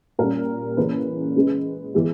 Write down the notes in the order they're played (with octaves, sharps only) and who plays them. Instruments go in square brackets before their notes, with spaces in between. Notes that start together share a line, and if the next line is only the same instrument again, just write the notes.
[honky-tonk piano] A#2 G3 C#4 A#4
C#3 E3 A#3 C#4 G#4 B4
C#3 G#3 C#4
E3 G#3 B3